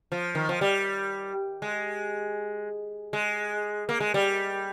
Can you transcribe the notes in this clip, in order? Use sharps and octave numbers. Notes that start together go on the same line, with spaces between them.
F3
D#3
F3
G3
G#3
G#3
A#3
G#3
G3